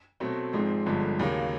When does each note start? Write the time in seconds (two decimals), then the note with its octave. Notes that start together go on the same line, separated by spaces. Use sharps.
0.20 B2 F#3 A3 C4
0.53 G#1 G#2 F3 G#3 C4
0.86 G1 G2 D3 F3 G#3
1.19 D#2 C#3 F#3 A#3